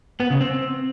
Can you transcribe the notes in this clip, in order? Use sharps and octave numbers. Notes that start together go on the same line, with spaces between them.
B3
C#3
C4